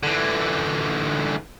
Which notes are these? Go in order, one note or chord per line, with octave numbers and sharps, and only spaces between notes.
D3 E3